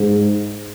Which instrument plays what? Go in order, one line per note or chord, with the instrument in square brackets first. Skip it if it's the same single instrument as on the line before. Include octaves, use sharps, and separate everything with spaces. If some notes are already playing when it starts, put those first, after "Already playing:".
Already playing: [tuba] G#2